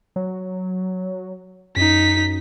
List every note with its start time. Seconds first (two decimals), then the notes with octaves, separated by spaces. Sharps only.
0.16 F#3
1.76 F#2 D#4 B6